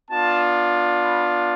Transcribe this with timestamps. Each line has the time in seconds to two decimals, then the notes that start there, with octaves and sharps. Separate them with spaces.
0.11 B3 D4 F4 A5
1.04 B5